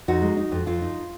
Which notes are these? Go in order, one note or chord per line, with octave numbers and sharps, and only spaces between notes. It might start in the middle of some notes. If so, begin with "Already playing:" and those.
F2 D#4 F#4
G#3
D#4
F2
F2 F4
D#4